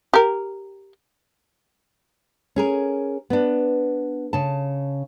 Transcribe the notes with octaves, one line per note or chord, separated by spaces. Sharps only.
G4 A#4
C#4 G#4 A#4
B3 D4
C#3 A5